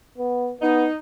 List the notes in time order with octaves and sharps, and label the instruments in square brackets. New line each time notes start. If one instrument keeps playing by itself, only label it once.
[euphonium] B3
[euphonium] B3 [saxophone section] D#4